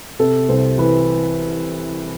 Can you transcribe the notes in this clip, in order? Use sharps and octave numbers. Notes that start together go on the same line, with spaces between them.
C3 A4
C2 C5
E3 B4